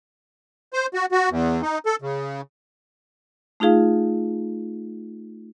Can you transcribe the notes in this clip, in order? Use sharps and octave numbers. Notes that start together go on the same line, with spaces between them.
C5
F#4
F#4
E2
D#4
A4
C#3
A3 D#4 F4 G#4 F5